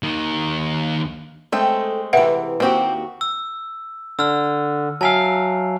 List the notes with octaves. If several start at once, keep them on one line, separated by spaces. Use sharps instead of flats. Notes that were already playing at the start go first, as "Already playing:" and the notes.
D#2 D#3
G#3 A3 C4 A4 G5
C3 E3 B4 E5 F#5
D#2 A#3 C4 F#4 G4
E6
D3 E6 F6
F#3 E5 F5 G#5 A5